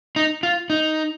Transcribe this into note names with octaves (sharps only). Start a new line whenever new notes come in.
D#4
F4
D#4